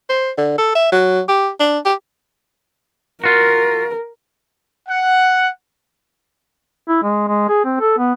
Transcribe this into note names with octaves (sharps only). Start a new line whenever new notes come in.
C5
D3
A4
E5
F#3
G4
D4
G4
F4 F#4 A#4
F#5
E4
G#3
G#3
G#4
C4
A4
B3